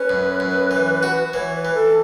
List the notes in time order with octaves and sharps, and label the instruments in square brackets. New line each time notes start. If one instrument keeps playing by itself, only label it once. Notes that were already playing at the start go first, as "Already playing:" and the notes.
Already playing: [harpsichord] C#4 [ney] B4
[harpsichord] F#2
F#2
E3
F#4
[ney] B4
[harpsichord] E3 [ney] C#5
[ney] B4
[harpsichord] E3
[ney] A4